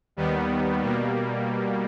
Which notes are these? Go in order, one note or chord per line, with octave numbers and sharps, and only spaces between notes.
D#2 D#3 G3 B3
B2 G3 A#3